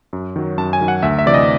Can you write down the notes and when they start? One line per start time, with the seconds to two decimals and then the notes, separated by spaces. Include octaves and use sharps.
0.13 F#2
0.36 D#3 F#3
0.58 F#2 A5
0.73 G#5
0.81 D#3 F#3
0.88 F#5
1.03 D2 E5
1.19 E5
1.26 C3 E3 D5
1.34 D#5